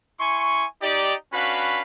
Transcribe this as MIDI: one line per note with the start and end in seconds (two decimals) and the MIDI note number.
0.20 0.65 64
0.20 0.65 80
0.20 0.65 84
0.20 0.65 85
0.82 1.13 63
0.82 1.13 67
0.82 1.13 74
1.33 1.82 61
1.33 1.82 62
1.33 1.82 66
1.33 1.82 71
1.33 1.82 77
1.33 1.82 83